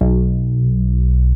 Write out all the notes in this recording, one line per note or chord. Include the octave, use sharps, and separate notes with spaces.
B1